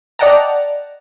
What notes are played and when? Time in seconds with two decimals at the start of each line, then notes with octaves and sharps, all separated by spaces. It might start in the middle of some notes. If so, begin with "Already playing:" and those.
0.19 D5 D#5 F#5 G5 A5 A#5